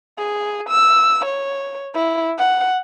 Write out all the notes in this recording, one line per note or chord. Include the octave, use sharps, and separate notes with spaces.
G#4
E6
C#5
E4
F#5